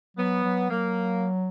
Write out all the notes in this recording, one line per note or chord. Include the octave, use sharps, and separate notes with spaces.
F#3 B3
F#3
F#3 A#3